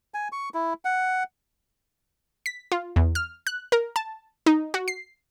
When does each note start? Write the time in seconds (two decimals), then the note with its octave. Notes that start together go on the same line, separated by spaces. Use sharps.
0.14 G#5
0.32 C#6
0.54 E4
0.85 F#5
2.46 B6
2.72 F4
2.96 E2
3.15 F6
3.47 F#6
3.72 A#4
3.96 A5
4.46 D#4
4.74 F#4
4.88 C7